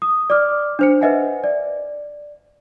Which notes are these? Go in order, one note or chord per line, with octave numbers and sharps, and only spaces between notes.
D#6
D5 D6 F6
D4 C5 C#7
B4 C5 D#5 E5 F#5 G#5
D5